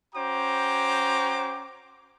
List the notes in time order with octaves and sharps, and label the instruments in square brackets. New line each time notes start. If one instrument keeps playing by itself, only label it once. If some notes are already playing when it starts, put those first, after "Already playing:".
[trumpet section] C#4 F#4 C5 G5 A#5 D6